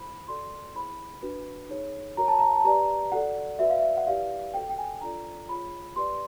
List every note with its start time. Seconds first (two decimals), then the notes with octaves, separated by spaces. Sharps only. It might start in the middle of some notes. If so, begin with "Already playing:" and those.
Already playing: E4 G#4 C5 B5
0.28 F#4 A4 D5 C6
0.75 E4 G#4 C5 B5
1.22 D4 F#4 B4
1.69 D#4 G#4 C#5
2.17 F#4 A#4 C#5 A#5
2.28 A5
2.39 A#5
2.56 A5
2.64 G4 B4 D5 A#5
3.12 F#4 A4 D5 F#5
3.59 F#4 B4 D5 E5
3.70 F5
3.79 E5
3.97 F#5
4.06 E4 G4 B4 D5 F5
4.53 F#4 A4 C5 G5
4.69 G5
4.78 G#5
5.01 D4 F4 A4 D5 A#5
5.49 F4 G#4 C#5 B5
5.95 G4 B4 D5 C6